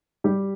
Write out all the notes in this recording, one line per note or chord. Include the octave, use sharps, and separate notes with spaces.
G3 G4